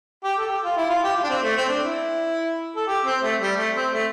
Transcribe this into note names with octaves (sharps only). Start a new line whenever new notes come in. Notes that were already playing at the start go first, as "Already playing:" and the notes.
G4
A4
G4
F4
E4
F4
G4
F4
D4
C4
A3
C4
D4
E4
A4
G4
C4
A3
G3
A3
C4
A3